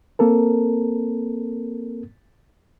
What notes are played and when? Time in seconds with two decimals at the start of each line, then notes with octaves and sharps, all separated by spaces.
0.19 A#3 C4 A4 A#4